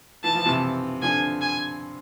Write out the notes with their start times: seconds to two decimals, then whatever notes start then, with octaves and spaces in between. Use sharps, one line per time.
0.24 E3 A5
0.35 F3
0.46 C3 E3
1.02 D3 F3 G#5
1.41 G#5